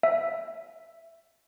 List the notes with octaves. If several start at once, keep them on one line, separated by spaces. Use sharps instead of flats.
E5